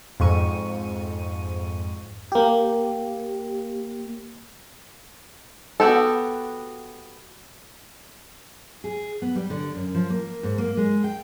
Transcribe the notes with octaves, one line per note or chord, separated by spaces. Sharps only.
F2 G#2 C#6 D#7
A#3 G4
B3 F#4 G4 A4
G#4
B3
G3
D3
F#2
F3
A#3
G#2
A#3
G#3
G5